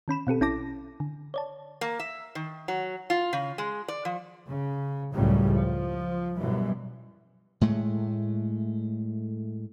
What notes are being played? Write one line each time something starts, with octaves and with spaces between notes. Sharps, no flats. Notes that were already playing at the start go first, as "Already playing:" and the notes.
D#3 C#4 B5 E7
B2 C4 G4 A4
A#1 C#4 E4 A5 D6 A#6
D3
C#5 D5 A5
A#3
E5
D#3
F#3
F4
C#3
G#3
D5
F3
C#3
C#2 F#2 A2 C#3 F#3 G3
F3
F#2 B2 E3 G3
A2 G#3 A3